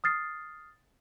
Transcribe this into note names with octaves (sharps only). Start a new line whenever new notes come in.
D#6 F6 A6 C7